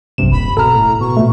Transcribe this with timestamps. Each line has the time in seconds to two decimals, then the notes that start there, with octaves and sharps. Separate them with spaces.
0.18 B1 G2 C3 E7
0.32 D#1 B5
0.57 B2 A4 A#5 F6
0.75 A2
1.00 B2 C#6
1.17 A#2 A3